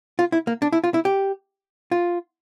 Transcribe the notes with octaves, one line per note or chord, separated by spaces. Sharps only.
F4
E4
A#3
D4
E4
F4
E4
G4
F4